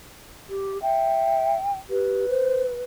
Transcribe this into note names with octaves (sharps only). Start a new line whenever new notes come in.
G4
E5 G5
G4 B4
C5